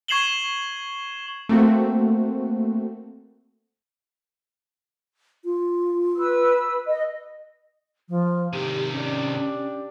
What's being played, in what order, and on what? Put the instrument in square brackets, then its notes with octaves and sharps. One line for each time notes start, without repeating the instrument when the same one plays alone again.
[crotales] C#6 G#6 C7 E7 F#7 G7
[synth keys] A3 A#3 C4 F#4
[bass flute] F4
[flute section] B4 E6
D#5
[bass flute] F3
[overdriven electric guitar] C3 D#3 [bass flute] G4
[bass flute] C#4 [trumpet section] D4 G4 D5